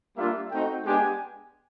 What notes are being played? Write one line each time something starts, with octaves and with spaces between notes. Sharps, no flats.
G3 A#3 D4 F4 E5
A3 C4 D#4 F#4 G5
G#3 B3 D4 G4 G#5